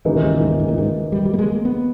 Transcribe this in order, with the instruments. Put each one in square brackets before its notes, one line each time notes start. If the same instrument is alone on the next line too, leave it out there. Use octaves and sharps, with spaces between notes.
[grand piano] D#2 C#3 E3 A#3 D#4 [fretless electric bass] G#2
[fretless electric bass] A#2
G#2
A#2
G#2
A#2
G#2
A#2
G#2
G3
G3
A#3
G#3
A#3
B3